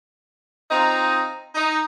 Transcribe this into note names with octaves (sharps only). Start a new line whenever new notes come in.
C4 D#4 F4 A#5
D#4